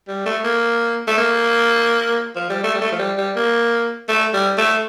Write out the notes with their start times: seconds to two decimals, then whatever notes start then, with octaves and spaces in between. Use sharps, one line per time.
0.08 G3
0.26 A3
0.44 A#3
1.07 A3
1.18 A#3
2.36 F3
2.49 G3
2.64 A3
2.74 G3
2.81 A3
2.92 F3
2.99 G3
3.18 G3
3.36 A#3
4.08 A3
4.33 G3
4.58 A3